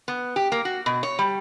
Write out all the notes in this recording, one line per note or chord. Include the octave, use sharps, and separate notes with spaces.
B3
G4
A#3
F#4
B2
C#5
G3